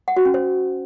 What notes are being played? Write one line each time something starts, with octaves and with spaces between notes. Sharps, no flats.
F#5
F#4
C#4
C5